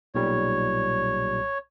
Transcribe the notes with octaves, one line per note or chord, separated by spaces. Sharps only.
B1 A#2 G3 C#5